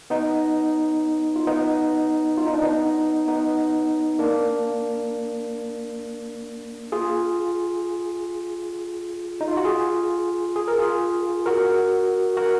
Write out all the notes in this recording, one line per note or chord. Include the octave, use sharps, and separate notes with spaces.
B3 D#4
F4
B3 D#4
F4
D#4
D4
B3 D#4
B3 D#4
A#3 D4
F4 G#4
D#4
F4
F#4
F4 G#4
G#4
A#4
F4 G#4
F#4 A#4
F#4 A#4